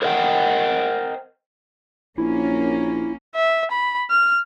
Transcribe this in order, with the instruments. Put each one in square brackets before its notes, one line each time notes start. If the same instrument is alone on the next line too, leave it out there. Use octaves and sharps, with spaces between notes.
[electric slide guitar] A#4 C5 D#5 F#5 G5
[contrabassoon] A#1 [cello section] A#3 C#4 [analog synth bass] E4
[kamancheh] E5
B5
F6